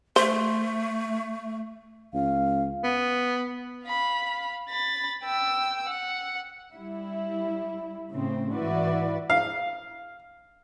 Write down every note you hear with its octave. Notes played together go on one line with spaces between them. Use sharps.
A3 C5
C#2 F5
B3
F5 B5
B5 A6
G5 E6
F#5
G3 E4
A2 C#3 A3 C4
G#2 E3 E4 F#4 B4 D5
F5